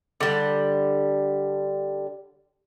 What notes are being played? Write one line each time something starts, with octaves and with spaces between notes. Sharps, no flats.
D3 G3